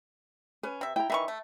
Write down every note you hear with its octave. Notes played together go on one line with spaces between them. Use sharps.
C#4 B4
C3 E5
E4 G5 A#5
D#3 E3 E5 C#6
A3